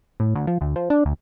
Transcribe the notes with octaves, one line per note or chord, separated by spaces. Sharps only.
A2
D2
F3
D2
F3
D4
D2